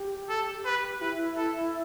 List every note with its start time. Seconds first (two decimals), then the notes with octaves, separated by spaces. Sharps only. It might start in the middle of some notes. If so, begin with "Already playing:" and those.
Already playing: G4
0.29 A4
0.65 B4
1.01 E4 B4
1.37 A4